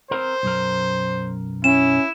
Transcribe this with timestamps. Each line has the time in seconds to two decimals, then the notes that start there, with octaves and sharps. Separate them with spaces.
0.11 C4 A#4 C5
0.43 B1 F#2 A#4
1.64 C#4 E4 E7